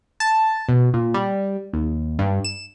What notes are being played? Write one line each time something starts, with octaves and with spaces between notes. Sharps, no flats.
A5
B2
A#2
G3
D#2
G2
E7